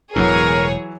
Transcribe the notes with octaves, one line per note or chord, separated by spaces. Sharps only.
E1 E2 A2 E3 F#3 G#4 A#4 C#5